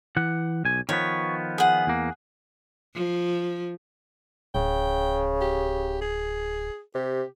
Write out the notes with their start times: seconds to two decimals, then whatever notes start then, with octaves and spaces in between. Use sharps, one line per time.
0.17 E3 F#5
0.65 B1 G#5
0.89 D#3 F3 B3 C#5
1.58 G#4 F#5
1.87 E2 A#3
2.95 F3
4.55 D1 C#3 G5
5.41 G4
6.01 G#4
6.95 C3 G4